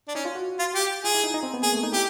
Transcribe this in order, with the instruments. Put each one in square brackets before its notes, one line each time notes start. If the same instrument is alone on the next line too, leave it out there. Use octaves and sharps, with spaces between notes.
[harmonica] D4
[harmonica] C#4 [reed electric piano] D#4
[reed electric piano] F4
F#4
[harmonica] F4
G4
[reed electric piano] F4 [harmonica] G#4
[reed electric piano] E4
D#4
D#4
C4
B3
[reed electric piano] A#3 [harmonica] G#4
[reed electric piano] A3
D#4
[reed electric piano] E4 [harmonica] G4